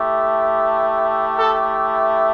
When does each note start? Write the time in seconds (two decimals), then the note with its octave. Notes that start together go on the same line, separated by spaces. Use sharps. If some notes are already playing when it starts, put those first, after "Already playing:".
Already playing: A3 E4 G4
1.38 A4